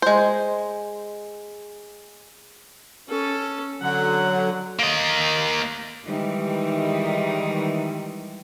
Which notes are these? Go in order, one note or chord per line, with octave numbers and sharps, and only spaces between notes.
G#3 C5
C#4 A4
D3 F#3 F#5
A#3 D#5
D#3 E3 G3 G#3 D#4